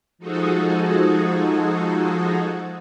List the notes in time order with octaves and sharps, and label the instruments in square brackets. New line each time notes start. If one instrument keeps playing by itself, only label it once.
[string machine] F3 G#3 D#4 F#4 G#4 A4